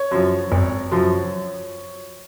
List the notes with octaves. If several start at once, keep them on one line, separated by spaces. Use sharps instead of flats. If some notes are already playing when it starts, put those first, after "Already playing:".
Already playing: C#5
F#2 F3
G#1
F#2 F3